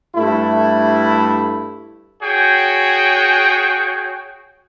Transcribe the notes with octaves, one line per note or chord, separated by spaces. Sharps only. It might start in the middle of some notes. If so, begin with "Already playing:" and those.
G2 A3 E4
F#4 G#4 C#5 G5